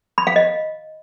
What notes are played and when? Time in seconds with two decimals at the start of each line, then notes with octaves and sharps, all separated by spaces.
0.18 B5
0.27 F5
0.36 D#5